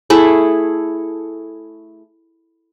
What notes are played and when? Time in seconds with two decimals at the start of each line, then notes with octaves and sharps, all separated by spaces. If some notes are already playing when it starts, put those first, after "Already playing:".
0.10 A3 E4 G#4